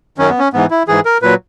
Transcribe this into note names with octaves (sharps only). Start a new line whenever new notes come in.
F#2 D#3 F#3 C#4
B3
C#4
G#2 E3 B3
E4
G#2 E3 G#4
A#4
A#2 F#3 B4